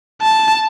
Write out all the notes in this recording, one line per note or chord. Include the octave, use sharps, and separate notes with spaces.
A5